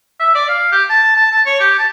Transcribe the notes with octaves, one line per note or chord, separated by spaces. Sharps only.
E5
D5
F5
G4
A5
A5
A5
C#5
G4
A5